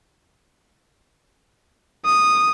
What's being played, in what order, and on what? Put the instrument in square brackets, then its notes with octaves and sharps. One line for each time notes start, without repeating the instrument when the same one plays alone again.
[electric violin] D#6